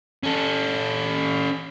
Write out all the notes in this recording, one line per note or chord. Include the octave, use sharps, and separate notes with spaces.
C#4 A4